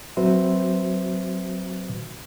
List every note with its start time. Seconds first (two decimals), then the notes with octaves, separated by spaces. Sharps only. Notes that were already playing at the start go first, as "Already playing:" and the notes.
0.17 F#3 C4 F#4 B4 C5 E5